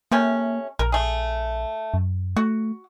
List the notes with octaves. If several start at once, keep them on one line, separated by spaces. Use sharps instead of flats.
C3 A3 A#3 C#4
A#1 A#4
A3 G#4
F#2
A3 F#4